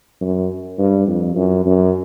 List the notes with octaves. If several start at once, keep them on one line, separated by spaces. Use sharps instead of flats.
F#2
G2
F2
F#2
F#2